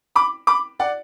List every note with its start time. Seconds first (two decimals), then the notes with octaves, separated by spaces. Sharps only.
0.16 B5 D6
0.47 B5 D6
0.80 D5 F#5